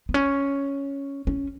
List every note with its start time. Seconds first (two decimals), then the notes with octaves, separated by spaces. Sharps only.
0.09 B3
0.14 C#4
1.27 C#4